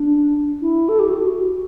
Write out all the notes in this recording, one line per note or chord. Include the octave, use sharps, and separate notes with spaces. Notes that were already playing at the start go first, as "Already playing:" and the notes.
Already playing: D4
E4
A4
G4
F#4
F#4